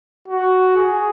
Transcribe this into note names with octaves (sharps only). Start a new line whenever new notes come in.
F#4
G#4